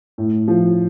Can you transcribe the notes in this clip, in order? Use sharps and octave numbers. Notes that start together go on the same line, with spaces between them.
A2
F3